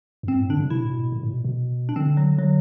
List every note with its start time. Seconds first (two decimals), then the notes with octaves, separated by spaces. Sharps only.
0.23 F#2
0.28 G2 C4
0.40 A2
0.50 D3 D4
0.60 C3
0.70 C3 E4
0.77 B2
0.85 A2
0.92 B2
1.12 A2
1.23 A2
1.33 B2
1.44 B2
1.89 D4
1.96 D3 C4
2.17 F#3
2.38 D3 F#3